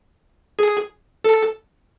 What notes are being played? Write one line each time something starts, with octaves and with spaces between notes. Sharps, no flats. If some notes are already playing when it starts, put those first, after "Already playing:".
G#4
A4